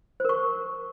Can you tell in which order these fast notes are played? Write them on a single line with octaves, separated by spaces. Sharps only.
C5 A#4 C#6